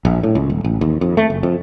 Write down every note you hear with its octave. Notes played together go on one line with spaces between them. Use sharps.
A#1
A2
C#2
D#1
A1
D#2
F2
A3
F#1
F2